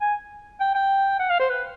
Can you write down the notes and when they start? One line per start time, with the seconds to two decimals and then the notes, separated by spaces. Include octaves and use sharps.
0.01 G#5
0.60 G5
0.75 G5
1.20 F#5
1.30 F5
1.39 C5
1.49 B4